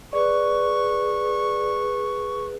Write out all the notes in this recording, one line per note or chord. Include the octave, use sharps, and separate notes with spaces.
G#4 B4 D5 C#6